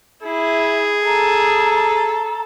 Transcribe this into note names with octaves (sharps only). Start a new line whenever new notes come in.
E4 G#4
A4 A#5